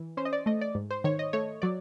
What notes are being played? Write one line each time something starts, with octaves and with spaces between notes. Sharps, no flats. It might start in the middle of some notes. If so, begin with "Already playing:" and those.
Already playing: E3
C#4 C5
D#5
D5
A3 D#5
D5
G#2
C5
D#3 C#5
D#5
A3 C#5
F#3 D5